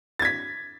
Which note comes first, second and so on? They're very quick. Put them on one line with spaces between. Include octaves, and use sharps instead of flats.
A6 G#6 B6